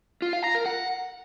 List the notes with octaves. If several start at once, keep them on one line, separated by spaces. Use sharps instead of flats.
F4
F5
A#5
A#4
F#5